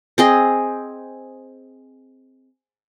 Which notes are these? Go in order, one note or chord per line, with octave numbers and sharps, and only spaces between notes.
C4 G#4 D#5